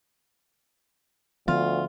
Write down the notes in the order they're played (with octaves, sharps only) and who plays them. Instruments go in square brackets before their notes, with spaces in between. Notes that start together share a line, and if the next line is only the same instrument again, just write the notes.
[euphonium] D2 [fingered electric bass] D3 F3 B3 [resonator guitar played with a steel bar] F4